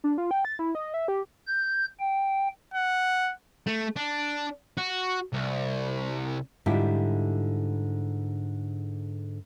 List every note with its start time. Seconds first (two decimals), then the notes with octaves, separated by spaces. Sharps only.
0.04 D4
0.18 F4
0.31 G5
0.45 A6
0.59 E4
0.75 D#5
0.94 E5
1.08 G4
1.46 G6
2.00 G5
2.74 F#5
3.67 A3
3.96 D4
4.78 F#4
5.33 C2
6.66 G#2 D3 G3 E4 F4 G4